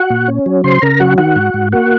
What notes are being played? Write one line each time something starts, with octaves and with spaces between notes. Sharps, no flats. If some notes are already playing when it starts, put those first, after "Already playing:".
Already playing: F#4 F#5
A#2
C#4
F#3
C#3 C5 C6
C#3 A#4 A#5
F#3 F#4 F#5
D#3 F#4 F#5
G#2
G#2
A#3 F#4 F#5